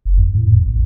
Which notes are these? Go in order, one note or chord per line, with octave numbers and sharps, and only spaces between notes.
F#1
F2
A2
F2
A1